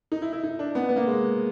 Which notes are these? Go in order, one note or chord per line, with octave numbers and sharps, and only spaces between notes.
D#4
E4
E4
D#4
D4
B3
B3
A#3
G#3